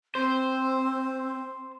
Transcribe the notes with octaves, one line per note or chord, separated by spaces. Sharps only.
C4 C5